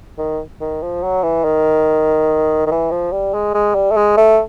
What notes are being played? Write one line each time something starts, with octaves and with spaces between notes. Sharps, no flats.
D#3
D#3
F3
F#3
E3
D#3
D#3
E3
F3
G3
G#3
G#3
G3
A3
G#3
A3